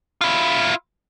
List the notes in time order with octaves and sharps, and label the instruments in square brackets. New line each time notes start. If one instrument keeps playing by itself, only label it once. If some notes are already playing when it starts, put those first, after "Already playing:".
[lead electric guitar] E4 F4